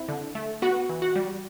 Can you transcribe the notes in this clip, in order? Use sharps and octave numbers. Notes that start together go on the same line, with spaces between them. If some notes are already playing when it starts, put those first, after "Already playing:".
Already playing: C4 E4
D3
A3
B3 F#4
E3
F#4
G3